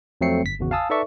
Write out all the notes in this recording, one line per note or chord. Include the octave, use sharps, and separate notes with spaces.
F2 F#3 A3 C4 C7 C#7
G1 B6
G#1 E2 C#3 F#4
F5 G#5 A5 D#6 E6
D#4 A4 B4 D5 E5 C#6